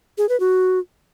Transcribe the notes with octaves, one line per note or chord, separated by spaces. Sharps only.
G#4
B4
F#4